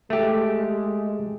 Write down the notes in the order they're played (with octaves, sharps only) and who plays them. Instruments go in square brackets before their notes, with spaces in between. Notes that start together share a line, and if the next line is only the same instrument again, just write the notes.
[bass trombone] G#3 [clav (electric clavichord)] A3 G4